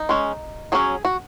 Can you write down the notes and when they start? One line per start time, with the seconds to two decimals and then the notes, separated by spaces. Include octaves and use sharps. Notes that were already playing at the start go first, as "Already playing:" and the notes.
Already playing: D#4
0.09 G#3 C#4
0.72 F#3 C#4 G#4
1.05 F#4